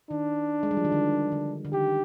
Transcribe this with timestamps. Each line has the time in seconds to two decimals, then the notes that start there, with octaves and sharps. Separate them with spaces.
0.11 D#3 D4
0.63 G#3
0.71 G3
0.77 F3
0.85 D#3
0.92 D3
1.32 D3
1.65 D3
1.73 D#3 G4